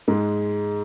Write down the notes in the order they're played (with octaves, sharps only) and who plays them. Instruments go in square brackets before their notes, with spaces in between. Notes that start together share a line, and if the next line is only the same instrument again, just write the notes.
[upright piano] G#2 G#3